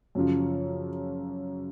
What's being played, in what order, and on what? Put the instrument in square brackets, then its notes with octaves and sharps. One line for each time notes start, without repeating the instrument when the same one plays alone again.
[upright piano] F#2 C#3 F3